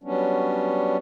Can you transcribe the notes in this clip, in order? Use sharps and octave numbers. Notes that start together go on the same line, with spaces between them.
F#3 G3 B3 C#4 D4